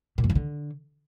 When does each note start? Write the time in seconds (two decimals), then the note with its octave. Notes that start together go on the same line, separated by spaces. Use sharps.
0.18 A#2
0.24 F#2
0.30 E3
0.35 D3